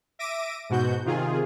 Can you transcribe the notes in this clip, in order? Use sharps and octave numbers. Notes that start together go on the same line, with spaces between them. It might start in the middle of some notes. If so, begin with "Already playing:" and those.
E5 D6 A#6 D7 D#7
G#2 B2 F#4 G6
C3 D#3 F4 G#4